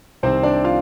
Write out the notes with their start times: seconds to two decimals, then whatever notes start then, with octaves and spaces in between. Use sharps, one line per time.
0.23 C2 C3 D#3 C4 C5
0.43 D4 D5
0.64 F4 F5